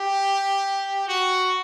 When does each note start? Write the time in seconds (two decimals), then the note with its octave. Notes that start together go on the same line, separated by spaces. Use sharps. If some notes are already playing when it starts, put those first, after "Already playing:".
Already playing: G4
1.08 F#4